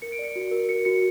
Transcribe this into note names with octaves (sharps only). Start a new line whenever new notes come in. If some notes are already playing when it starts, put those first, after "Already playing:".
A#4 C#7
D7
D5 C#7
F#4
A#4
A#4 C#7
F#4 C#7